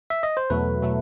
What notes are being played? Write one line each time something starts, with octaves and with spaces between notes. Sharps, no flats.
E5
D#5
C5
E2 B2 F#3 A3 B4
B2 F#3 A3